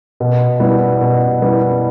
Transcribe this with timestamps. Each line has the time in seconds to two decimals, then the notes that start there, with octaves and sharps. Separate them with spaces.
0.20 B2
0.60 G3 B3 E4
1.01 B2
1.41 G3 B3 E4